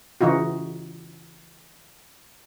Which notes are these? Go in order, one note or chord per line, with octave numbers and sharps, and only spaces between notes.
C#3 E3 D#4 F4 F#4